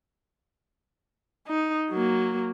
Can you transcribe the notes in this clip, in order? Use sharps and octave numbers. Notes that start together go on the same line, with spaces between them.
D#4
F#3 A#3